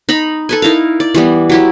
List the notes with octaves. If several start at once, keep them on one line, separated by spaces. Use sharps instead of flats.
D#4 A#5 B5
A4 B4 G#5
D#4 E4 A#4 F5
D5
E3 G3 B3
F#3 E4 G4